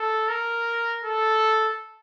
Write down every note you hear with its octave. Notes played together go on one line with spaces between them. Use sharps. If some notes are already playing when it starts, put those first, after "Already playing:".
Already playing: A4
A#4
A4